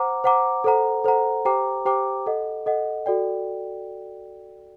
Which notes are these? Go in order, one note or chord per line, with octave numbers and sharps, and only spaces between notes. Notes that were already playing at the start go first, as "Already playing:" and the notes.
Already playing: C5 F#5 A#5 D6
C5 F#5 A#5 D6
A4 C5 F#5 A#5
A4 C5 F#5 A#5
G4 C5 G5 A#5 D6
G4 C5 G5 A#5 D6
A4 D#5 F#5
A4 D#5 F#5
F#4 A4 D5 G5